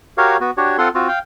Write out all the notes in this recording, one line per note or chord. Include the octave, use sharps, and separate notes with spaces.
F#4 G4 A#4 C#5 F5
B3 F#4
D4 F#4 G4 C#5
C4 F4 A4 F#5 C6
C4 F4 F#4
F5 G5